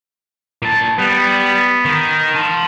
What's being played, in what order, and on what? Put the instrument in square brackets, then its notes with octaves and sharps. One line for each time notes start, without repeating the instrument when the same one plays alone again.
[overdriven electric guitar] A#2 A5
[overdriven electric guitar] G3 [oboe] B3
[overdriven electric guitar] D#3
A5 C6